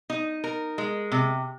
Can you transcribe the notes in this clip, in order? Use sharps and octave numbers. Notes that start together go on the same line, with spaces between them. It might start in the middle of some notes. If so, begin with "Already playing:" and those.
D#4
A#4
G#3
C3